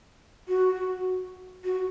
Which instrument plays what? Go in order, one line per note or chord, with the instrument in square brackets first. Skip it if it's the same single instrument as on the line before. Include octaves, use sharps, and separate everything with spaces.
[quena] F#4
F#4